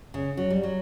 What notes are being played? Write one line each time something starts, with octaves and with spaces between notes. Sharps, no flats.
C#3
F#3
G3
F#3